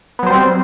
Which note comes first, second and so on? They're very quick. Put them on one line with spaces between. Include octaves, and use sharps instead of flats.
B3 F#3 C5 G3 C4